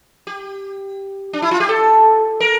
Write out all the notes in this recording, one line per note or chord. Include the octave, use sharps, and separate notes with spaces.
G4
D4
E4
F4
G4
A4
A#4